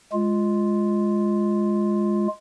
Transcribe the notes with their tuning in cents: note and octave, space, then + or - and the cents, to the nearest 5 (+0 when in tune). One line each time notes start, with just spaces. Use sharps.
G#3 +0 F4 +0